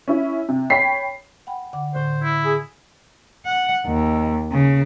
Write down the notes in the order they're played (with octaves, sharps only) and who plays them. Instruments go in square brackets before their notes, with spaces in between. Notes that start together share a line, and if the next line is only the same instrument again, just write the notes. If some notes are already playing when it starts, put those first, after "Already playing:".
[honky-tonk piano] C#4 E4
C3
C#5 G5 B5 B6 C7
[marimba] F#5 G5 B5
D3 F#5 D6
[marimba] A2 D3 [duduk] C5
[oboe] E4
[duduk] G#4
[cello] F#5
D#2
C#3